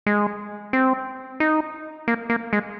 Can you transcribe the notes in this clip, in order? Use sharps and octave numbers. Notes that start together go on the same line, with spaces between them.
G#3
C4
D#4
A#3
A#3
G#3